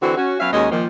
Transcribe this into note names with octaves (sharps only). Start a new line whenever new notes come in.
D3 E3 C4 F#4
C#4 F#4
F#3 B3 C#4 E5 F5
D#2 G#3 C#4 D#4 F#4 D#5
A#2 D#3 F3